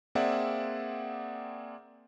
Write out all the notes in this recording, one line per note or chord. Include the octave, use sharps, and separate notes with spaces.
A#3 C4 G#4 D5 E5 F#5